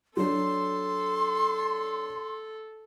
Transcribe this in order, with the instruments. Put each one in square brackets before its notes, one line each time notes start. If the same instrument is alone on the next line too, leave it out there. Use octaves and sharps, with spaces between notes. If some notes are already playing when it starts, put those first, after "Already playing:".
[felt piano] F#3 D4 [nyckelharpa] A4 [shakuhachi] C6